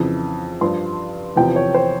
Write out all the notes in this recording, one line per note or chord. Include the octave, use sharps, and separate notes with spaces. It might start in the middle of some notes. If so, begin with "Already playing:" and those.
Already playing: F2 C#3 E3
G2 F3 C6
E2 C3 F3 G5
C#5
C5